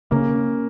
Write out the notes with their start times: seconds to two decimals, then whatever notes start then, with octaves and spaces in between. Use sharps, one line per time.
0.11 C#3 A#3 C#4